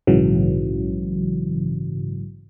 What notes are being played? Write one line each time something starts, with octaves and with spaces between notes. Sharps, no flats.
A#1 G#2 C#3 E3 F#3